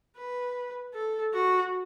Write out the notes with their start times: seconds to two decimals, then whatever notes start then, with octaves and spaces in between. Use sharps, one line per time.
0.17 B4
0.94 A4
1.33 F#4